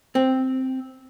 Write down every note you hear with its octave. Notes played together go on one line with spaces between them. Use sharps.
C4